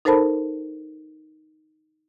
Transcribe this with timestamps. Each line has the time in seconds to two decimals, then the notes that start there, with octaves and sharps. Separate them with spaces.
0.05 D#4 A4 A#4 C5 A5 B5